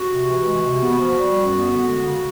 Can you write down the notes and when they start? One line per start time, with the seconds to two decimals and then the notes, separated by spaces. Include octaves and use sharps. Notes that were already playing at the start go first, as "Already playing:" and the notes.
Already playing: F#4
0.09 C3
0.26 E3
0.44 G#3
0.62 C3
0.80 B3
0.97 F3
1.15 G3
1.34 F#2
1.52 B3
1.70 D3
1.87 G#3
2.05 C#3